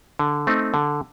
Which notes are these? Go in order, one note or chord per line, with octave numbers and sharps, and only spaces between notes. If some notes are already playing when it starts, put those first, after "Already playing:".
D3
A3 C4 D#4
D3